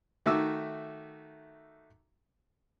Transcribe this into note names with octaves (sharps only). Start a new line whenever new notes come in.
D#3 A3 F#4 E5 D6 E6